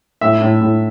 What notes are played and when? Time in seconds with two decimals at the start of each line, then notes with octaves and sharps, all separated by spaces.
0.21 A2 E5
0.41 A2
0.61 A2